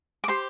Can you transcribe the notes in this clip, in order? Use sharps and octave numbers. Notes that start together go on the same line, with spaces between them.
D6
G4 C5 C6